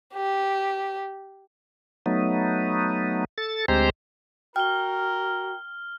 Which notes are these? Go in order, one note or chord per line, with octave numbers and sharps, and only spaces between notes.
G4
F#3 A3 B3 D#4
A4 A6
D2 G#3 C4 G4 C5 A#5
F#4 A#4 G5 F6 G7